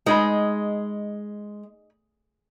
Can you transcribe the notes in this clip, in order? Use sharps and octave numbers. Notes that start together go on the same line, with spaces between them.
G#3 D#4 G#4 B5